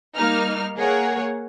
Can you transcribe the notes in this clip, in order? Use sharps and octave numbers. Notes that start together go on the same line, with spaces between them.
G3 A#3 D#4 F6
A#3 G#4 A#4 C#5 F#5